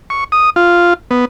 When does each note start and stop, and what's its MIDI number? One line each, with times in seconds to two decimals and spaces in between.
0.10 0.24 85
0.32 0.50 87
0.56 0.94 65
1.11 1.25 59